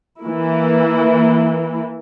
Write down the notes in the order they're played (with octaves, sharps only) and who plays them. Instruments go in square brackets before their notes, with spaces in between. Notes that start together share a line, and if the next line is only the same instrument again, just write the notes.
[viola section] E3 A#3 E4